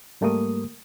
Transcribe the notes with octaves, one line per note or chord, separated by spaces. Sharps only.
G#2 G3 A3 A#3 A#4 D#6